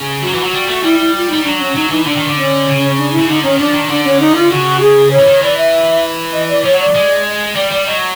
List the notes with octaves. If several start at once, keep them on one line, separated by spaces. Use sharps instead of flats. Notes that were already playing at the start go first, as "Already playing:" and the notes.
Already playing: C#3
F#3 F#4
E3 F#4
F#3 F#4
G3 F#4
A3 F#4
G3 E4
E4
F4
G3 D#4
F#3 D4
C#4
F#3 D#4
E3 D#4
D3 D4
D#3
D3
C#4
C#3
D4
E4
C#3
D3 D#4
D#3 C#4
F3 D4
D#3
D3 D4
C#4
D#4
F4
C#3 F#4
G#4
C#5
E3
D#3
E3 D5
E5
D#5
D5
F3 C#5
F#3
D5
G#3
D#5
G3 D5
G3 D5
F#3 D#5